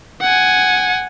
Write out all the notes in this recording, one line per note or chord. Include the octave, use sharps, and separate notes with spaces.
F#5 G#5